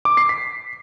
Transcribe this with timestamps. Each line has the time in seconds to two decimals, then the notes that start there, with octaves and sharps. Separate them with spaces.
0.05 D6
0.17 C7
0.29 B6